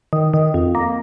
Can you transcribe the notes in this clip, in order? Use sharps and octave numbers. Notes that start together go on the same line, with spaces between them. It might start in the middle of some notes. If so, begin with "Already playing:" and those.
D#3
D#3
F2
A#3